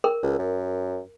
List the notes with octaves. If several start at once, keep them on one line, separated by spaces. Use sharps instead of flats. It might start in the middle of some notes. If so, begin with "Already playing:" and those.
A#4
C#2
F#2